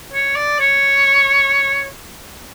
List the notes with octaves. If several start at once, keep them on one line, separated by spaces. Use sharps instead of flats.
C#5
D5
C#5